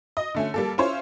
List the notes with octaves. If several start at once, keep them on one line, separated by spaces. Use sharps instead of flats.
D#5
D3 A3 C#4
G3 A#3 A4
C#4 E4 F4 C5 C#5